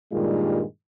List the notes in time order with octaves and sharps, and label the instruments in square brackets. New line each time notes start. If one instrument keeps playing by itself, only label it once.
[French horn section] G2 A#2 D#3 G3 G#3 F4